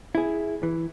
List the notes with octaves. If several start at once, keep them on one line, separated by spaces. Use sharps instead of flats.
E4 G#4
E3